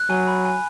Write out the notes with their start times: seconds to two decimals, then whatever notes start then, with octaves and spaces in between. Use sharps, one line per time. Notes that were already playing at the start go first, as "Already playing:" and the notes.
Already playing: F#6
0.10 F#3 G#5
0.28 B5
0.45 G#5